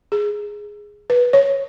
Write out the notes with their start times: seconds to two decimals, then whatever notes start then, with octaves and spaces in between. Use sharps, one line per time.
0.12 G#4
1.10 B4
1.33 C#5